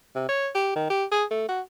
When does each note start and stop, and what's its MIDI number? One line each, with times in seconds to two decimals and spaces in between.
0.15 0.29 48
0.29 0.50 73
0.55 0.74 67
0.76 0.86 51
0.90 1.05 67
1.12 1.25 68
1.31 1.48 57
1.49 1.61 66